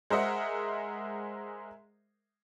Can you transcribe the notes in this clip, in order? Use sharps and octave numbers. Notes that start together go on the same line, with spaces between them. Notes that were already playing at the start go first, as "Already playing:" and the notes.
G#3 A#4 C5 D#5 E5 F#5